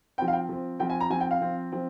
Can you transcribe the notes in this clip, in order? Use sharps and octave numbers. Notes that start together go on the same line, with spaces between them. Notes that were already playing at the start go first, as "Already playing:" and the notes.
F3 C4 G5
F5
G5
F3 C4
F3 C4 G5
G#5
A#5
F3 C4 G#5
G5
F5
F3 C4
F3 C4